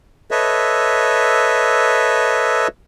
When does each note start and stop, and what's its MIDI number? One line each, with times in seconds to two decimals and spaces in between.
0.31 2.67 69
0.31 2.67 71
0.31 2.67 73
0.31 2.67 75
0.31 2.67 76